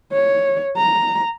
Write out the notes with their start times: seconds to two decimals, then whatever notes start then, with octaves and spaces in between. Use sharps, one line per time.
0.12 C#5
0.77 A#5